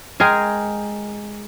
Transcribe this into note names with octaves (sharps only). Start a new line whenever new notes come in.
G#3 G#4 A#4 G5